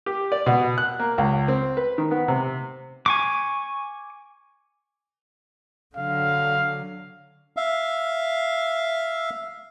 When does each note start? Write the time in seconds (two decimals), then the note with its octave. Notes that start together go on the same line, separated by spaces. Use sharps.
0.06 G4
0.32 D5
0.46 B2
0.78 F#6
1.00 A#3
1.18 C#2
1.48 C4
1.77 B4
1.98 D#3
2.11 B3
2.28 C3
3.06 G#5 C#6 D6
5.96 D3 F#3 F5
7.57 E5 F5